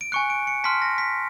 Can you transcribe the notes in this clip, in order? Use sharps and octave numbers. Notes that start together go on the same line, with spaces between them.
D7
G#5 C#6 F#6 C#7
D7
C#7
A5 C6 F6 B6
A#6
B6